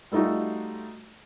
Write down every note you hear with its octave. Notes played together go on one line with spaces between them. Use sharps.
G3 A3 D#4 F4 F#4